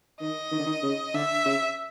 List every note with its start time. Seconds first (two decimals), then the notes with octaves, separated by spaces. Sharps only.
0.20 D#3 D#5
0.51 D#3
0.59 D3
0.66 D#3
0.83 C#3
1.14 D3 E5
1.46 C#3